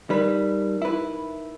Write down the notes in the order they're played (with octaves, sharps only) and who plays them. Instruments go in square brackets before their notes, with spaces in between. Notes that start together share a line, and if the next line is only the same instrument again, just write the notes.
[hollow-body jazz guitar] G3 B4 [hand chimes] D#4 A#4
[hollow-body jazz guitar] E4 B4